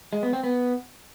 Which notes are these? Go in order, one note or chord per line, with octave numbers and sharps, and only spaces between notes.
G#3
B3
C4
B3